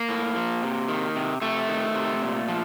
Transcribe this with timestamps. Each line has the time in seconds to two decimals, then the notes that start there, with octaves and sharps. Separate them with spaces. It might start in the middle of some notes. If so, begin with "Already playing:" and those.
Already playing: A#3
0.09 A2
0.36 F3
0.63 C3
0.88 D#3
1.16 C3
1.41 C3 A3
1.69 D#3
1.95 C3
2.22 A#2
2.48 F3